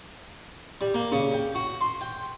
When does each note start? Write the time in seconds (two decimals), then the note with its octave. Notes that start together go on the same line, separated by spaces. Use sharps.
0.81 G3
0.94 A#3
1.12 C#3
1.34 G5
1.55 F#4
1.81 C6
2.01 G5